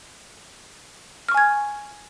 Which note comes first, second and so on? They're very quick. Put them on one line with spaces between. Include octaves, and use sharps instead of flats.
F6 C#6 G#5 G#6